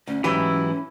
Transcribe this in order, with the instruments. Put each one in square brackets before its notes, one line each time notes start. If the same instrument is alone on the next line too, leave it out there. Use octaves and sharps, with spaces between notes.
[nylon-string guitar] D2 [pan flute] C#4
[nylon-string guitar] G#2 F#3 G4 [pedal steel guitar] E3 E4